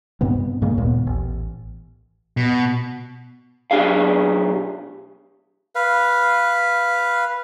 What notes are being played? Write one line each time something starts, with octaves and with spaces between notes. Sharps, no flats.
G2 C3 B3 C4
G2 C#3 G#3 A#3
D#2 A#2 B3
A1
B2
B1 G2 D4 G4 G#4 F5
B4 F5